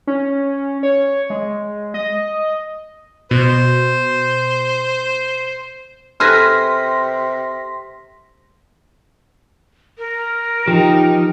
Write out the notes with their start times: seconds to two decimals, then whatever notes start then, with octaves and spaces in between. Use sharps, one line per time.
0.07 C#4
0.83 C#5
1.30 G#3
1.94 D#5
3.31 B2 C5
6.20 C3 A4 B4 G#5 C6 F6 A#6 B6
9.98 A#4
10.68 F3 D#4 G4